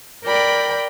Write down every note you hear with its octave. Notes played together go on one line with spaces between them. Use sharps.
A#4 D5 G5 B5